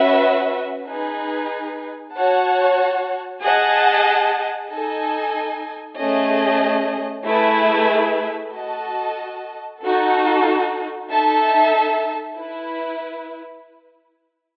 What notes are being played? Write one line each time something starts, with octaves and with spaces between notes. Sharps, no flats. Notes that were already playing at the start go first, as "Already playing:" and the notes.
Already playing: C#4 F#4 B4 E5
D#4 G#4 B4
F#4 C#5 F#5 A5
G#4 D#5 F#5 A5
D#4 A4 D#5 G#5
A3 C#4 G#4 D#5
A3 E4 G#4 B4 E5
F#4 A4 D#5 A5
D#4 F#4 A4
D#4 A4 E5 A5
E4 B4